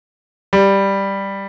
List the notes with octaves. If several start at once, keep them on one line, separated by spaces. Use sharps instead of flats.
G3